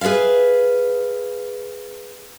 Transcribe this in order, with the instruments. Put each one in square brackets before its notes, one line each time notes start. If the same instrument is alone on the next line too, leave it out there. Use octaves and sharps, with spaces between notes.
[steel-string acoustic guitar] G#4 B4 D5 E5 F5